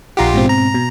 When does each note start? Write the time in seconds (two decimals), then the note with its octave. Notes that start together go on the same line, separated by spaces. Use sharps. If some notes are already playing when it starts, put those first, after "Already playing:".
0.17 A#1 F4 G4 F#5 A#5 C6
0.34 G#2 B2 C4
0.49 A#5
0.74 B2